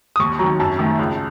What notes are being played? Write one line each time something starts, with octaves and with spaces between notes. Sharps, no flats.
D#6
D#2 C#6
D#3 F#3 A#5
F#2 A5
D#3 A3
C#2